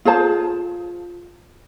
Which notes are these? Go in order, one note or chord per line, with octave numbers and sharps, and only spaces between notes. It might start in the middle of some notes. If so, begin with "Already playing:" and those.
F4 G#4 C5 A5